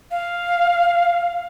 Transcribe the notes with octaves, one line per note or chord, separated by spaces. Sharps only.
F5